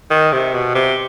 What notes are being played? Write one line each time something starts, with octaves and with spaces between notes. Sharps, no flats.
D#3
C3
B2
C3